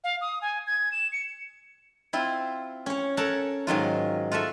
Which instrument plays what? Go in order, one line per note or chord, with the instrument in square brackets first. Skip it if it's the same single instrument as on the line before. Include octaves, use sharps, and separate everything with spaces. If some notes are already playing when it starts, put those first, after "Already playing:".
[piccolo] F5
D#6
G#5
G#6
E7
C#7
[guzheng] C4 E4 F4
C#4 C#5
A4 A#4 C#5 F#5 A5
G#2 D#3 F#3 F4
F4 F#4 A4 E5